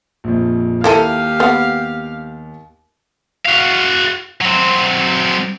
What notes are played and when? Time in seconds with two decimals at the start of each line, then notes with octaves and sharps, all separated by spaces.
0.24 A#1 F2
0.84 D#2 A#3 E4 G4 A4 F5 D#7
1.40 B3 F#5
3.45 F#4 F5
4.41 F#3 C4